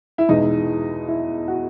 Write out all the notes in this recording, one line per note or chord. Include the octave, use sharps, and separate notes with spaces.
E4
E2 B2 G#3 D#4
E4
F#4